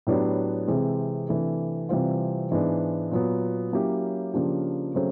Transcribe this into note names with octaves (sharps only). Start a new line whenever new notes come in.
A2 F#3 B3 D4 G4
C3 E3 G#3 C4
C3 E3 A3 D4
C3 E3 G3 C4 F4
G#2 E3 G#3 B3 D4
A#2 F#3 B3
F#3 A#3 C#4 E4 G4
C#3 F3 A#3 D4 G4
C#3 F#3 A3 C4